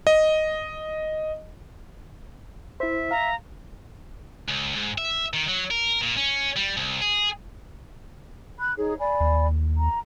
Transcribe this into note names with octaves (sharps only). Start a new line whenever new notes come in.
D#5
E4 C5 E5
F5 A#5
C#2
G#2
E5
D#3
F#3
A#4
A#2
C#4
G3
C2
G#4
B5 F#6
D#4 G#4 C#5
D5 G#5 B5
D#2
A#5